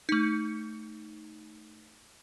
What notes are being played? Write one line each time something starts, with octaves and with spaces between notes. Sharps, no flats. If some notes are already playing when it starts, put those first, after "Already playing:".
A3 D#4